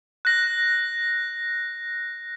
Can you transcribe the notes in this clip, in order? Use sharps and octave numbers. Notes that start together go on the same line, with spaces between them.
F#6 A#6